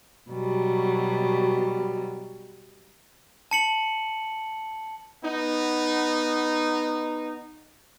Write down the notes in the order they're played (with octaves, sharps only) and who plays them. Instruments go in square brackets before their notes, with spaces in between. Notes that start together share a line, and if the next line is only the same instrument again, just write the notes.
[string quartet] B2 F#3 G3
[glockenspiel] A5 C#7 F#7
[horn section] B3 D#4